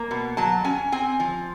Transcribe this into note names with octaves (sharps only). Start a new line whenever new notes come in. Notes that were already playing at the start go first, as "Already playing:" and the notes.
Already playing: A#3 A#5
B2
F#3 A5
C#4 G#5
C4 G#5
F3